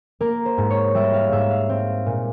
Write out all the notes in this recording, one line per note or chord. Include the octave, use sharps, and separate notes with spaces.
A#3 A#4
C5
G#2
C#5
G3 E5
F5
G#2 E5
F5
C4
A#2